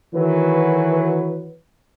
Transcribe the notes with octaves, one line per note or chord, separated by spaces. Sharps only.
D#3 E3 F#3 A3 F#4 B4